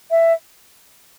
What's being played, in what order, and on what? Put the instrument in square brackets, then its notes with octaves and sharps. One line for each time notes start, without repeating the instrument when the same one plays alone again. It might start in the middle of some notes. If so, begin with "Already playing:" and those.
[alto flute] E5